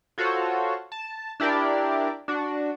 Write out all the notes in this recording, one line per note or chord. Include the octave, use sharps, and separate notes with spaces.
F4 F#4 A4 C5 C#5
A5
D4 E4 G4 A#4 D5
D4 F#4